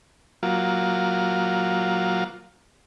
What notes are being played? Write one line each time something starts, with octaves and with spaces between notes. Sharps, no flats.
F#3 A#3 F4